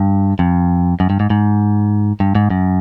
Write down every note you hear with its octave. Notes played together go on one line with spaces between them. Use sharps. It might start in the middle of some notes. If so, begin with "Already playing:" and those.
Already playing: G2
F2
F#2
G2
G#2
G#2
G2
G#2
F#2